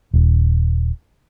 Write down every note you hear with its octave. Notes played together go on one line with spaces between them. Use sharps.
D#1